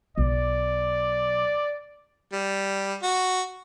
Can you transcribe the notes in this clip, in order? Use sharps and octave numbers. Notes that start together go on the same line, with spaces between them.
B1 D5
G3
F#4